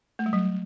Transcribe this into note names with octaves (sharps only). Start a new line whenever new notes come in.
A3
G3
F#3